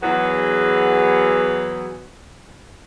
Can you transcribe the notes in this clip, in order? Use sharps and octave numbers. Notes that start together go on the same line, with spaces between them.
E2 F#3 E4 F#4 G#4 B4